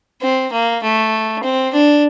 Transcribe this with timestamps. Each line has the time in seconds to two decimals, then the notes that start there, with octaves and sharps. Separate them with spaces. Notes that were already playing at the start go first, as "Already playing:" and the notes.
0.22 C4
0.52 A#3
0.83 A3
1.43 C4
1.73 D4